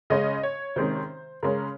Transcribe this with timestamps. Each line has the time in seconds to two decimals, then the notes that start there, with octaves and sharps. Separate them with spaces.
0.10 C#3 G#3 C#4 D#5
0.43 C#5
0.76 C3 D#3 G#3 C#4 C5
1.43 C#3 G#3 C#4 A#4